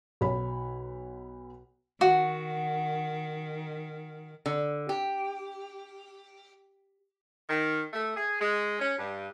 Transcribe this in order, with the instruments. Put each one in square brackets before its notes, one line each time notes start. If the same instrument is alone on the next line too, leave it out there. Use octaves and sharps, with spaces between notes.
[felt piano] B1 C#5 B5
[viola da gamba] D#3 [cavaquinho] F#4
[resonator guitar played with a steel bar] D3
G4
[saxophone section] D#3
A3
G#4
G#3
C#4
G2